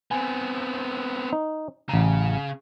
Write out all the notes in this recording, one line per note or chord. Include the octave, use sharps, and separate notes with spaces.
B3 C4 G#5
D#4
A1 C#3 A#5